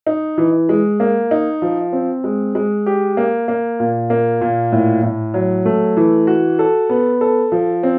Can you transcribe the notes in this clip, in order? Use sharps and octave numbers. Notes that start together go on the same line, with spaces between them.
D#4
E3
G#3
A#3
D#4
F3
C4
G#3
G#3
G4
A#3
A#3
A#2
A#3
A#2
A2
A2
F#3
A3
E3
F#4
A4
B3
A4
F3
C4